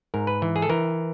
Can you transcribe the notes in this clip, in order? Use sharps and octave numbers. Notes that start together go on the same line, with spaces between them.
G#2 A#4
B4
E3
G#4
A4
E3 A#4